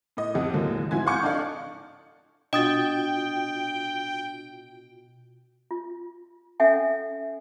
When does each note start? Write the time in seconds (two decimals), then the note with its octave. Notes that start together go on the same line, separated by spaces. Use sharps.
0.17 A2 D#5
0.34 F2 G4 D#5 F#5
0.54 D#2 A2 D3 F#3 G#3 A#3
0.91 G#2 F3 E4 F#4 G#5 G#6
1.06 F5 F#5 G#5 C#6 G6 C#7
1.23 D4 A4 D5 D#5 F5
2.53 B2 D4 F4 F#4 D#5 G5 D#6 A6
5.71 F4
6.60 C#4 A4 E5 F#5 G#5